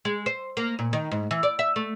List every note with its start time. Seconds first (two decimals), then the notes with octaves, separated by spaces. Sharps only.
0.05 G#3
0.26 C5
0.57 A#3
0.79 A#2
0.93 D#3
1.12 G#2
1.31 E3
1.43 D5
1.59 E5
1.76 A3